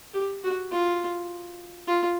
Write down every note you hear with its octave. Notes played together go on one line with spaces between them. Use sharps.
G4
F#4
F4
F4